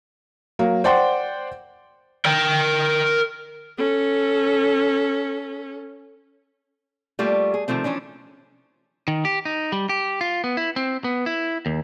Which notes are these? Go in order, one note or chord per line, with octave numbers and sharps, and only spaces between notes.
F#3 A#3
C5 D5 F#5 G5 C6
A#4 G5
C#4 A4
G3 A3 A#3 F4
G#4
C3 D#3 F3 A3 C4
E3 F3 C#4 D4
D#3
G4
D#4
G3
G4
F4
B3
E4
C4
B3
E4
D#2